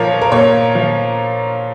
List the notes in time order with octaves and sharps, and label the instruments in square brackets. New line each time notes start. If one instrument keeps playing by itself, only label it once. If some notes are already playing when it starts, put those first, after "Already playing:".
Already playing: [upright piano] A#2 F3 A#4 C#5
A#4
A#2 C#5
F3